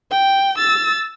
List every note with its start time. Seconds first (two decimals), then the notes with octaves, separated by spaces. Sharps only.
0.11 G5
0.58 E6 A6